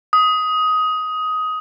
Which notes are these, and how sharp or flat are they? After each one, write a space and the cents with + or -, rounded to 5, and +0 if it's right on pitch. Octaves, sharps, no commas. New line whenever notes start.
D#6 +15